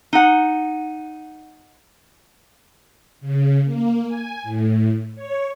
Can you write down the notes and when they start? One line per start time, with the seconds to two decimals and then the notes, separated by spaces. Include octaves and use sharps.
0.13 D#4 F#5
3.21 C#3
3.65 A#3
4.08 G#5
4.43 A2
5.15 C#5